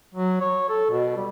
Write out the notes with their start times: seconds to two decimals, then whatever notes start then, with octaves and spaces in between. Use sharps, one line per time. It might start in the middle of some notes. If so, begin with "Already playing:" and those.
0.14 F#3
0.41 C#5
0.69 A4
0.90 B2
1.17 G3